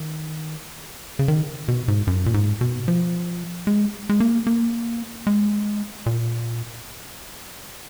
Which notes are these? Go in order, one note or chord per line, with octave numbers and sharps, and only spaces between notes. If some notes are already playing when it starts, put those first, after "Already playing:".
Already playing: D#3
C#3
D#3
B2
G#2
F#2
A#2
G#2
B2
F3
G#3
G#3
A#3
A#3
G#3
A#2